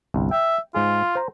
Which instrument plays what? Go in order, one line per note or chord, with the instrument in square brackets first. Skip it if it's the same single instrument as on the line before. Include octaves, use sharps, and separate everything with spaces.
[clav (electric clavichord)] G1 C2
[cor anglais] E5 [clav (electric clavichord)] G5
[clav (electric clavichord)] G#2 G#4 [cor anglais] F4
[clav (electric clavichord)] C5 A#5